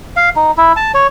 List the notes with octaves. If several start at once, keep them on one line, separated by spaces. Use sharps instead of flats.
F5
D#4
E4
A5
C#5